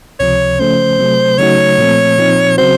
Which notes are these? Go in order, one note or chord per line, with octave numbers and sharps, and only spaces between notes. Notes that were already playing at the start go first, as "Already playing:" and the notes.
C#2 C3 F3 C#5
C#3 F3 A3 C#4 C5
C3 F#3 A3
C#3 F#3 A3 D#4 F#4 C#5
A#2 F3 A3 C4
A#2 F3 C4 D#4
C#3 F#3 C4 F#4 C5